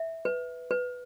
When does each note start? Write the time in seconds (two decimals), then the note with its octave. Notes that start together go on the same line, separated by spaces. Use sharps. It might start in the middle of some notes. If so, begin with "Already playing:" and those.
Already playing: E5
0.25 B4
0.71 B4